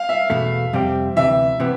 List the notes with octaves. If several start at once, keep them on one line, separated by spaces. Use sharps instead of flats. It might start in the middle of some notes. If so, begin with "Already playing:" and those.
Already playing: F5
E5
E2 B2 A3
F2 C3 G3 C4 G4
D2 C3 E3 E5
C3 E3 B3